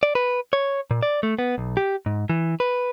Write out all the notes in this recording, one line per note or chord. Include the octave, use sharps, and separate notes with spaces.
D5
B4
C#5
A#2
D5
A3
B3
B1
G4
G#2
E3
B4